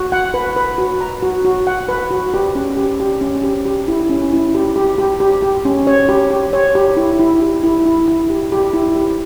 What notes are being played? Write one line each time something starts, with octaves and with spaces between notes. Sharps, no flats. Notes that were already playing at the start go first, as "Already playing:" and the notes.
Already playing: F#4
F#5
B4
B4
F#4
A#5
F#4
F#4
F#5
B4
F#4
G4
C#4
G4
G4
C#4
G4
G4
E4
C#4
E4
G4
G4
G4
G4
G4
C#4
C#5
G4
G4
C#5
G4
E4
E4
G4
E4
E4
E4
G4
G4
E4
G4